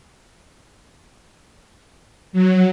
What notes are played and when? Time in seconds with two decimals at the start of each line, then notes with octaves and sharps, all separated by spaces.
2.33 F#3